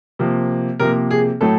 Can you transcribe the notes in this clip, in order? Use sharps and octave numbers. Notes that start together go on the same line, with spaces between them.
C3 F3 A#3
C3 F3 A#3 A#4
G#4
A2 F#3 A3 A4